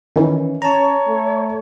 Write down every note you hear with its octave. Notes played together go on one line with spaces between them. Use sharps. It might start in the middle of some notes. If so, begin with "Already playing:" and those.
D#3 E3 C#4
C#4 C#5 A5 A#5
A3